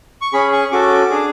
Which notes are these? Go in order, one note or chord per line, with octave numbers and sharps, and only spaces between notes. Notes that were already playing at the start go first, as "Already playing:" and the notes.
C#6
C#4 G#4 B5
C#6
C#4 F#4 A4 D6
D4 G#4